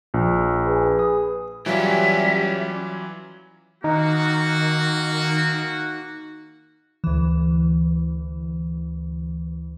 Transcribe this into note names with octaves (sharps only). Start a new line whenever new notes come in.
A#1
G#4 B4
D#6
E3 F#3 G3 C#4 F4 G4 E5
D#3 A#3 D#4 F#4
D2 E3